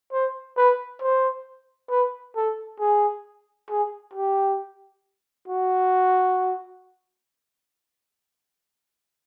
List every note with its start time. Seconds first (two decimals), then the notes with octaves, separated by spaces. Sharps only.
0.12 C5
0.57 B4
1.01 C5
1.90 B4
2.36 A4
2.80 G#4
3.69 G#4
4.13 G4
5.48 F#4